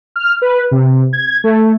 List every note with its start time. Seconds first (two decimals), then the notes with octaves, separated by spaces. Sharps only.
0.16 F6
0.42 B4
0.71 C3
1.13 G#6
1.44 A3